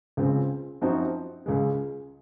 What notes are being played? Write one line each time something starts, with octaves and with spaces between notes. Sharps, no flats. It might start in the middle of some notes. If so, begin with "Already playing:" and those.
C#2 C#3 G#3 C4 F4
F#2 F3 C4 D#4 F#4
C#2 C#3 G#3